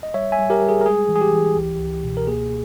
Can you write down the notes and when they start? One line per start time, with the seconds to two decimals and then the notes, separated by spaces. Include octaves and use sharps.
0.03 D#5
0.14 G3 C#5 E5
0.32 E5 G#5
0.39 G3
0.50 G4 A#4
0.62 G3
0.69 G#4
0.81 A#4
0.86 G#3 G#4
1.09 E3
1.16 G#4
1.21 G4
1.33 E3
1.56 C#2
1.80 C#2
2.03 B2
2.17 A#4
2.27 A#3 G#4